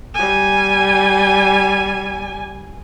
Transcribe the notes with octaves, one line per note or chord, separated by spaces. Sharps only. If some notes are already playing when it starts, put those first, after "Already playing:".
G3 G#5